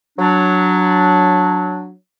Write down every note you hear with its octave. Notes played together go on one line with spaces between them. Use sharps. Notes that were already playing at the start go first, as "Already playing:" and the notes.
F#3 D4